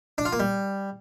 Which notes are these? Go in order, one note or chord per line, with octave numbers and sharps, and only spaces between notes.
D4
F4
A#3
G3